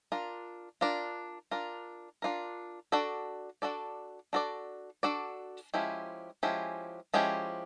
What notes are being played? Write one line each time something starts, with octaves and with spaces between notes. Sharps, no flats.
D4 F4 A#4
D4 F4 A#4
D4 F4 A#4
D4 F4 A#4
D4 F#4 A4 D5
D4 F#4 A4 D5
D4 F#4 A4 D5
D4 F#4 A4 D5
F3 G#3 C#4 E4 G4
F3 G#3 C#4 E4 G4
F3 G#3 C#4 E4 G4